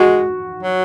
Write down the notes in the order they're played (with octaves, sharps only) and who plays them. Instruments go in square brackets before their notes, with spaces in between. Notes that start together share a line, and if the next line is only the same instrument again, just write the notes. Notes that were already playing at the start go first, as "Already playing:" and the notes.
Already playing: [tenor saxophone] G#3 [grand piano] F#4
[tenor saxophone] F#3